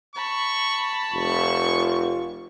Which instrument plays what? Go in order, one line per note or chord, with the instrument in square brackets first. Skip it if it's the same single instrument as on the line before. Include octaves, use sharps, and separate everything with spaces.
[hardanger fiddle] A5 B5 [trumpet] C#6
[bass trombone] F1 [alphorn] F4 [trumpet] C#6